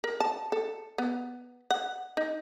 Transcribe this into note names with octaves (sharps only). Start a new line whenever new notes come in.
A#4
A5
A4
B3
F#5
D#4